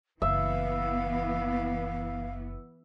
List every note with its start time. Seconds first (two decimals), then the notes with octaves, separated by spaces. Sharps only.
0.22 F#1 E3 B3 E5 F5